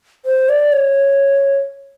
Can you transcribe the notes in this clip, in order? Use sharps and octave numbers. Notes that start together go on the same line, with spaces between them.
C5
D5
C#5